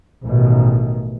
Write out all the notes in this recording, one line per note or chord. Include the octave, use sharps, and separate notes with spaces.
A1 B2 D#3